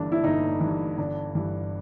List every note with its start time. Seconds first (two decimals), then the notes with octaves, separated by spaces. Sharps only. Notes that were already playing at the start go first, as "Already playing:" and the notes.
Already playing: G1 G2 E3 D4
0.12 E4
0.24 G1 D#4
0.61 E3
0.66 G2
0.98 G1 D4
1.35 G2 E3